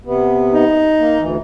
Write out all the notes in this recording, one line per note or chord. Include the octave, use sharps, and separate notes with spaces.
C3 B3
D#4
A#3
D2 E3